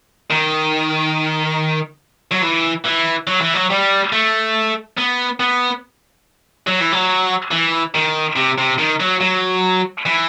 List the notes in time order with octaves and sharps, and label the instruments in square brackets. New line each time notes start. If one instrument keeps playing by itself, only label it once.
[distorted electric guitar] D#3
F#3
E3
E3
F#3
E3
F#3
G3
A3
B3
B3
F#3
E3
F#3
E3
D#3
C3
C3
D#3
F#3
F#3
E3